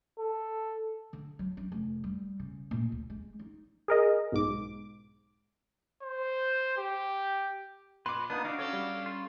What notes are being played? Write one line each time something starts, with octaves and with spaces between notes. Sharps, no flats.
A4
D3
F#3
D4
F1
G3
C#3
A#2
D2
G#3
D#4
G#4 A#4 D#5
B1 G#2 D6
C5
G4
A#2 B4 C6 D6
A#3 B3 D4 D#4 D#6 F#6
D4 D#4 F#4 F5 D6
C#4 A4 C#5
G3
F4